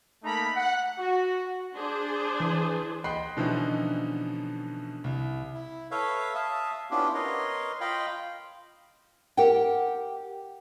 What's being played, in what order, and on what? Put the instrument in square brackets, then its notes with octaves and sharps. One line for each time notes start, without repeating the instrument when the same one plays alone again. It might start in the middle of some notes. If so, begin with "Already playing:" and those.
[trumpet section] A3 A#3 D#4 A#5 B5
F#5
F#4
[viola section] D4 G#4 C5
[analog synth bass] E3
[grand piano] D#5 G5 B5 C6 F#6 C7
B2 D3 E3 F3 C#4 D#4
C2
[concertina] E4
A4 B4 C#5 E5 F5
E5 F5 A5 D#6
B3 C#4 D4 E4 F4 G4
A#4 B4 C#5 D#5 C6
F4 D#5 F5 G5 B5
[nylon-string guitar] G4 A#4 F#5 G5